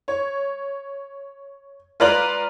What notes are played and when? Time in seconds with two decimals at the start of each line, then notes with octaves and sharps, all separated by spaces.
0.08 C#5
2.00 F4 B4 D5 A#5 F#7